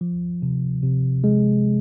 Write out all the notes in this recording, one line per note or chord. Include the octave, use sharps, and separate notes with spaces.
F3
C3
C3
G#3